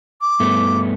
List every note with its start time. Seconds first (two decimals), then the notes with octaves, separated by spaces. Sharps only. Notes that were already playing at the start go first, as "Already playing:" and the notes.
0.21 D6
0.40 G2 A3 B3